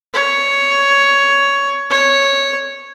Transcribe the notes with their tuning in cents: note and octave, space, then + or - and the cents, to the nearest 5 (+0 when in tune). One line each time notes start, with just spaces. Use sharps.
C#5 +10
C#5 -5